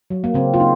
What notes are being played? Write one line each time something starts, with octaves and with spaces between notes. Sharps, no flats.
F#3
A#3
C#3 C4
F4
D#4